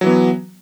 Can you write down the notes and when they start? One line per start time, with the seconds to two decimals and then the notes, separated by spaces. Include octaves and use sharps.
0.01 F#3
0.04 E3
0.06 B3